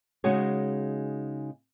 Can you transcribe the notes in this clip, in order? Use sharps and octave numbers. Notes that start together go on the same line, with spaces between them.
C#3 G#3 D#4 F#4 G#4 C#5